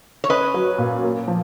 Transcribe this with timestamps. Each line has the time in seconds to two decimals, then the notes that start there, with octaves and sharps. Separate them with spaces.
0.24 C#5
0.29 C#4 B4 D#5
0.54 F#3
0.78 A#2
1.04 A#3
1.28 F3